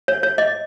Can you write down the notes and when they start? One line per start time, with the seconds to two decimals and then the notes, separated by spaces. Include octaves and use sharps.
0.08 C#5
0.23 C#5
0.38 D#5